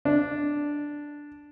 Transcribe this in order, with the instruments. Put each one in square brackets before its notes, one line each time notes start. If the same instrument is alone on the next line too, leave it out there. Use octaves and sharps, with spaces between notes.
[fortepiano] D4